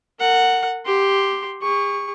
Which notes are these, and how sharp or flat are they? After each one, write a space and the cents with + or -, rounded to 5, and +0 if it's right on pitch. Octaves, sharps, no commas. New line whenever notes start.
A#4 -35 F#5 +0
G4 +0 C6 +0
G#4 -45 C#6 +0